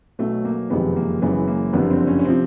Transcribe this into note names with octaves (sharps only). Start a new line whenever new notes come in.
B1 B2 F#3 A3
A#3
F#1 F2 C3 D#3 G#3 B3
A#3
F#1 F#2 C#3 E3 G#3 B3
A#3
F#1 F2 D3 G3 B3
C4
C#4
C#4
C3 F3 C4